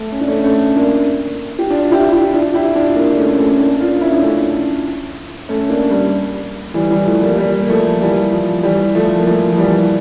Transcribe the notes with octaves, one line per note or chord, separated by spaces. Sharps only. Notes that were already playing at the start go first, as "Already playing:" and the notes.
Already playing: A3
C#4
D4
A3 C#4
A3 C#4
A#3 D4
G4
D4 F4
E4 G4
E4 G4
D4 F4
E4 G4
D4 F4
A#3 D4
A3 C#4
A3 C#4
A#3 D4
D4 F4
C#4 E4
D4
A3 C#4
A3 C#4
A#3 D4
G3 A#3
E3 G3
E3 G3
F3 A3
G3 A#3
G3 A#3
A#3
F3 A3
E3 G3
F3
E3 G3
F3 A3
A#3
F3 A3
F3
E3 G3